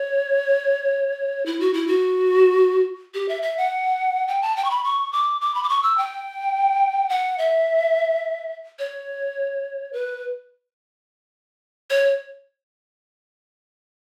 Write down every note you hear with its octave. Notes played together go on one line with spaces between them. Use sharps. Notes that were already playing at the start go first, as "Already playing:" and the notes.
Already playing: C#5
E4
F#4
E4
F#4
G4
E5
E5
F#5
G5
A5
G5
C#6
B5
C#6
D6
D6
B5
D6
C#6
E6
G5
F#5
E5
C#5
B4
C#5